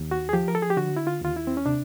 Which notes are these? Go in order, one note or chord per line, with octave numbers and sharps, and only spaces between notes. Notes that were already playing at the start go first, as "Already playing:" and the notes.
Already playing: D#2
F#4
G#4
F3 G4
A#4
A4
G#4
G4
D3 F#4
E4
F4
D#2 F4
E4
C4
C#4
C3 D4